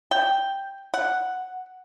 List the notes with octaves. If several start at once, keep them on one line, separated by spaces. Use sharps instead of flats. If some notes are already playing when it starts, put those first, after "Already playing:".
G5
F#5